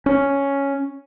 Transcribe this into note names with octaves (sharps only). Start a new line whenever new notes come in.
C#4